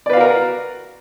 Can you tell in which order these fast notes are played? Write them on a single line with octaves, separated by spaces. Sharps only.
D5 B4 F5 F#4 A#4